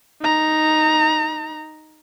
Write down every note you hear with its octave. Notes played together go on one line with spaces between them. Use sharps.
D#4 A#5